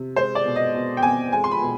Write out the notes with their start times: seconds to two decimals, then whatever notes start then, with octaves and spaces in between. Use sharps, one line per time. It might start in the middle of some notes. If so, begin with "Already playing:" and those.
Already playing: C3
0.16 G#3 C5
0.35 D5
0.45 B2
0.56 D#5
0.74 B2
0.97 G5
1.03 B2 G#5
1.32 G#3 G#5
1.44 C6
1.51 B5
1.61 B2